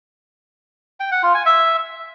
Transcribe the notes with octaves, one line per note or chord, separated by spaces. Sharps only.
G5
F#5
F4
G#5
E5